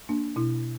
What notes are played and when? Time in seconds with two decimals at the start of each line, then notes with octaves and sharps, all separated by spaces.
0.09 A#3 D4
0.36 B2 E4